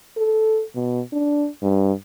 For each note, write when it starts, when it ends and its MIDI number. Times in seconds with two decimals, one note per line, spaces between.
0.17 0.63 69
0.76 1.01 47
1.13 1.48 62
1.62 1.93 43